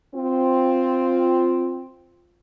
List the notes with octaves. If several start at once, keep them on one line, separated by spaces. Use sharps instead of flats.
C4 F4